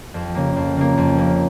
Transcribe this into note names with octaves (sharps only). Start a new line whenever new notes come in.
F2
C#3 A#3
F2
C#3 A#3
F2
C#3 A#3